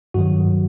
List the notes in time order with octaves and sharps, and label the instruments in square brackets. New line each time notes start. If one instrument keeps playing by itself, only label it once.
[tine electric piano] G2 D#3 F#3 F#4